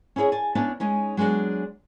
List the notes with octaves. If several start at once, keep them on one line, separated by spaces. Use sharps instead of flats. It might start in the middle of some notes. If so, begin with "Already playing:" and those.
C#4 E4 G#4 C#5 D#5
D5 G#5 A5
B3 C#4 D4 E4 E5 A5
G#3 C#4 D#4
F#3 G#3 B3 D4 F#4